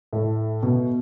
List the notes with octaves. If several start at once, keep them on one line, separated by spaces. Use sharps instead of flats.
A2
B2